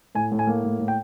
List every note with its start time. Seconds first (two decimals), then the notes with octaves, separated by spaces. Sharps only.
0.15 A2 G#5
0.32 A2
0.39 G#5
0.47 A#3
0.64 A2
0.80 A2
0.88 G5